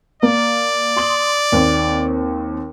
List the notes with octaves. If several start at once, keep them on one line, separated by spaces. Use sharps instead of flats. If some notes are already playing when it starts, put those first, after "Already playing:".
A#3 D5
C6 D#6 F#7
D#2 C4